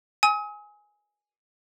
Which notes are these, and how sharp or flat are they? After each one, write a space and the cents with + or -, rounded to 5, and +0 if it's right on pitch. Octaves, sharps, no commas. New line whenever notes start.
G#5 +0 D#6 +40